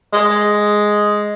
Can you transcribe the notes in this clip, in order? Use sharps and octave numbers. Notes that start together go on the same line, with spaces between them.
G#3